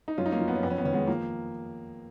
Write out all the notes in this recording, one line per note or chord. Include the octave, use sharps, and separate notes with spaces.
D#4
F#2 C#4 F4
D#4
A#3 C#4
F3
B3
C#4
F2 B3
C#4
B3
D#3 C#4
G#3 B3
F3 A#3